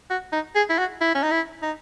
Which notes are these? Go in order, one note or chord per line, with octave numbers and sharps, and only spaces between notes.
F#4
D#4
G#4
E4
F#4
E4
C#4
D#4
E4
D#4